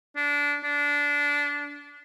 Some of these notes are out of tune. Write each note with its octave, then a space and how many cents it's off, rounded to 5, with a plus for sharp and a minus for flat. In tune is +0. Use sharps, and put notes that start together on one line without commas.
D4 -20
D4 -20